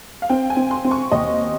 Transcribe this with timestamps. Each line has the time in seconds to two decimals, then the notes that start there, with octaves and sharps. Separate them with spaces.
0.22 F5
0.29 C4 G5
0.50 G#5
0.57 C4
0.71 C6
0.84 C4
0.91 C#6
1.11 D#2 D#5